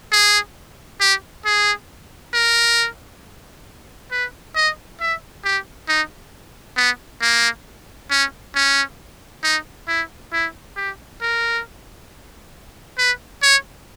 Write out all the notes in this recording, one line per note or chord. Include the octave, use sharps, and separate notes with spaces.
G#4
G4
G#4
A#4
B4
D#5
E5
G4
D#4
B3
A#3
C#4
C#4
D#4
E4
E4
G4
A#4
B4
C#5